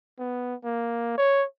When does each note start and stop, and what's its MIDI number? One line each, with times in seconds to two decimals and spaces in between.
0.19 0.55 59
0.64 1.15 58
1.18 1.45 73